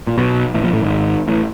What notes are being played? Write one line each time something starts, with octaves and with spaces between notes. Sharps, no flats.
A#2
B1 B2
A1 A2
A#1 A#2
A1 A2
G#1 G#2
A1 A2